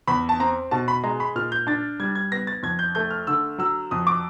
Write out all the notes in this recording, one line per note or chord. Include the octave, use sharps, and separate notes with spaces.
E2 B5
A5
C4 A#5
B2 A5
B5
G#3 A#5
B5
A#2 F6
G6
D4 A6
G3 G#6
G#6
B3 A#6
A6
F2 G#6
G6
A3 G6
F6
D3 E6
F#3 E6
F2 D#6
D6